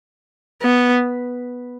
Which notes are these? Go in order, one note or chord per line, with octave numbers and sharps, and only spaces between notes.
B3